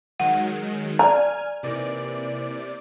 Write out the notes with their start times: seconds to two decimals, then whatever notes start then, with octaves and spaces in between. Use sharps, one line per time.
0.20 D#3 F#3 G#3 F#5
0.99 D5 G#5 A#5 F6
1.63 C3 E3 A#3 D#4 D5